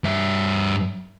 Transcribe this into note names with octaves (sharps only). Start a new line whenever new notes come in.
G2 E5